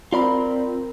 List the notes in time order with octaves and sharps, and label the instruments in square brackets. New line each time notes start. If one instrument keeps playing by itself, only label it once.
[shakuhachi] C4 [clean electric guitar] F4 D5 B5 [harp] A#4